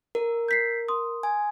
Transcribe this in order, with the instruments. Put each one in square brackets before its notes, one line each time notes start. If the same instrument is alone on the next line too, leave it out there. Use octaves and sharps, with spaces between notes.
[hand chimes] A#4
[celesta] G6 B6 C7
C6 D#6
[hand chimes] G#5